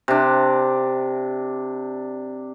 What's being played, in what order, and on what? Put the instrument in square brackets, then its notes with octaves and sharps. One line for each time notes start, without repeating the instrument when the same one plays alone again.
[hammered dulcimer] C3 D4